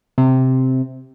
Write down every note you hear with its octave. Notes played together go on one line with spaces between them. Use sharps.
C3